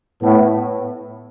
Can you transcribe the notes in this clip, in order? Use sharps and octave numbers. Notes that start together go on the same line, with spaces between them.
A2 B3